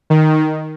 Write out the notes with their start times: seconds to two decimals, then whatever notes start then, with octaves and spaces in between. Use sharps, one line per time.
0.10 D#3